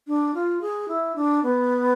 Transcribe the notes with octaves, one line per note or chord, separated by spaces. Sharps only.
D4
F4
G#4
E4
D4
B3